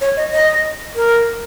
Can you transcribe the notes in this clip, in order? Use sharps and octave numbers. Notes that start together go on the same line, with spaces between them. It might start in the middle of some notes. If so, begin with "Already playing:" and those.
C#5
D#5
D#5
A#4